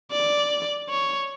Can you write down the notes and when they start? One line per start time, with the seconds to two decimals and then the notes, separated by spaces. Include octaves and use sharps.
0.12 D5
0.89 C#5